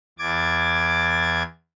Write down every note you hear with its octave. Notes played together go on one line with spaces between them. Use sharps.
E2 D6 G#6 A6